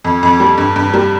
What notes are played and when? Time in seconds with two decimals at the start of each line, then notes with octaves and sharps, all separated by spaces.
0.04 F2
0.23 F2
0.40 G3
0.58 G2
0.76 G2
0.94 G3